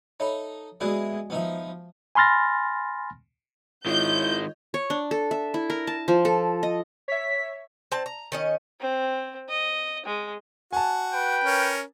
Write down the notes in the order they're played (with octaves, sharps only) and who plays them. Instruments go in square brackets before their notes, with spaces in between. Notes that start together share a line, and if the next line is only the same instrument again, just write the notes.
[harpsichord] D#4 A4 [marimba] C#5 E5 B5
[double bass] G#3 [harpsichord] B3 E4 G#4 [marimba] F#4 D5
[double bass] F3 [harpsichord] B3 D#4 E5
[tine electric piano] G#5 B5 C6 F6 A6 A#6
[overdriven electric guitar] D#3 G#3 [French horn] E4 [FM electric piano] F4 C#5 D#5 [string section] G6
[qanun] C#5
D4
A4
E5
E4
A#4
A5
F3
A4
D#5
[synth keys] C#5 E5 [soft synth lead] B6
[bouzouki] C4 A5
A#5
D#3 C#4 D#5
[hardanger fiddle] C4
D#5
G#3
[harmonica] F#4 [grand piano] G#5 A5
[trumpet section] B4 G5
[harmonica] C#4 A#4